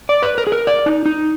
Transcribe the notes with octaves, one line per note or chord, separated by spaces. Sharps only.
D5
B4
A#4
G#4
A#4
D5
D#4
D#4